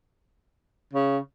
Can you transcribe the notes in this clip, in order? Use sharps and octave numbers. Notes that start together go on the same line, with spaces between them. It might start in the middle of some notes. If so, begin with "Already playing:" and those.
C#3